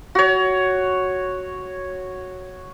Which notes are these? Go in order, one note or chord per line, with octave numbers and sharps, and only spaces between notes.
F#4 C#5